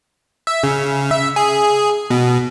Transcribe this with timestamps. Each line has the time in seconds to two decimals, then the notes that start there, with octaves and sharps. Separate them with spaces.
0.47 E5
0.63 C#3
1.11 E5
1.36 G#4
2.10 B2